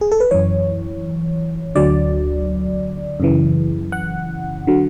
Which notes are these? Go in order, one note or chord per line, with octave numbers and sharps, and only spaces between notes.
G#4
A4
B4
F#2 E3 C#5
D2 D3 F#3 D5
F#2 C#3 E3
F#5
D3 F#3